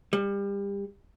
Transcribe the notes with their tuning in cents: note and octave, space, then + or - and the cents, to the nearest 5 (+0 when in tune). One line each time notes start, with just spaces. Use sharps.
G3 +30